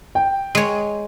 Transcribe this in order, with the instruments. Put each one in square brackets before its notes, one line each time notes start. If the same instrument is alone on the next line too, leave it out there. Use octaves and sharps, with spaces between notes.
[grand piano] G5
[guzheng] G#3 C#5